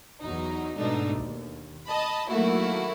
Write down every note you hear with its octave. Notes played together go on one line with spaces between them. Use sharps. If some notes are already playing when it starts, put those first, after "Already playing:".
E2 F#3 D#4
G#2 B2 A3 D4 D#4
D#2
D#5 A5 B5
D#3 F#3 A3 A#3 E4 F#4